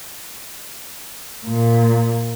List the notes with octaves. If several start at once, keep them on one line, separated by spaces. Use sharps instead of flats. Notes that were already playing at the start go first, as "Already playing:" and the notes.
A#2